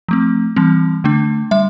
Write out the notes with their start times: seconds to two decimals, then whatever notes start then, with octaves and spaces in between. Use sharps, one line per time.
0.08 F3 A3 C4
0.56 E3 G3 C4
1.04 D3 A3 D4
1.51 G3 E5